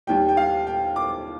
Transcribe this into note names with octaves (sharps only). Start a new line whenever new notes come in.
D#2 D#3 G3 G5
G5
F5
G5
D6